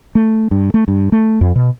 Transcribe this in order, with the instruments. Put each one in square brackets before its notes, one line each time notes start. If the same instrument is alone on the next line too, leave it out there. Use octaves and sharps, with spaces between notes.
[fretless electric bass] A3
G2
A3
G2
A3
F2
B2